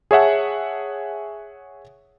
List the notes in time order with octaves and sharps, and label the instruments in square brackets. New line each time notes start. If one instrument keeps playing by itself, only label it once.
[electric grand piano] G#4 C#5 E5 F#5 A5